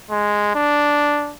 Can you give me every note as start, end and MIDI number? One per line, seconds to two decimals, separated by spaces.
0.11 0.52 56
0.55 1.34 62